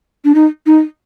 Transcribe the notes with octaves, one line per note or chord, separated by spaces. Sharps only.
D4
D#4
D#4